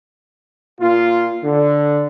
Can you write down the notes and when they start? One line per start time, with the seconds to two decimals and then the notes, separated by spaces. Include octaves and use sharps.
0.81 A#2 F4
1.44 D3